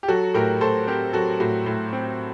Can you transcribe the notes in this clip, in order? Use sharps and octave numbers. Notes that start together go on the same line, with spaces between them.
G4
F#3 F#4 A4
A2 G4 A#4
A2 A4 C5
C4 G4 A#4
F#3 F#4 A4
A2 F#4
A2
C4